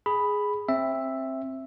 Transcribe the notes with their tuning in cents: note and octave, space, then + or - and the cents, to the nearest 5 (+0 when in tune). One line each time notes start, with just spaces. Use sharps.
G#4 +0 B5 +0
C4 +20 E5 +0